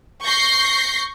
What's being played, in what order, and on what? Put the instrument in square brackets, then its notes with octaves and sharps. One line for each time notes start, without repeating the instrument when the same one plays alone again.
[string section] C#6 G6 A#6 C7